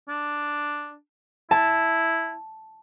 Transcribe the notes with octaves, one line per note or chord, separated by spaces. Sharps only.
D4
E4 A5